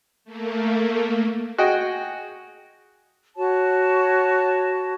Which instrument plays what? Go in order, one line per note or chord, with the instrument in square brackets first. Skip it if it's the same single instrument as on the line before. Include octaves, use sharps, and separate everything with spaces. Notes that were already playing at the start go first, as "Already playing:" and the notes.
[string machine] A3 A#3
[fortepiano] F#4 G#4 D#5 G5
[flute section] F#4 C#5 A5